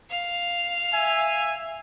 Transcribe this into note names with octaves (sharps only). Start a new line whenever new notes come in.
F5
E5 G#5